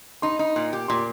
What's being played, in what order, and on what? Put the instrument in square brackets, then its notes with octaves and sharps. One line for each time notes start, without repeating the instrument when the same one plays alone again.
[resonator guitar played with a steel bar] D#4 [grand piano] C6
[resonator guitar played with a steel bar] D#4
A#2
G4
[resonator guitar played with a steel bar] A#2 [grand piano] C6